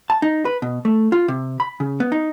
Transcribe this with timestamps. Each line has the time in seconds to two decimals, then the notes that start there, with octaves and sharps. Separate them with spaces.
0.10 A5
0.22 D#4
0.45 B4
0.62 B2
0.85 A3
1.12 F4
1.28 C3
1.60 B5
1.80 C#3
2.00 B3
2.12 D#4